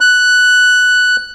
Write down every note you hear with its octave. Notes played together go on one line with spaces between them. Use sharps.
F#6